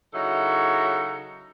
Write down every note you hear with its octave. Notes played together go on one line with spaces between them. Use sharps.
C#3 F#3 D#4 E4 A4